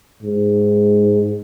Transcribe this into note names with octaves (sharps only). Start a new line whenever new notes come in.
G#2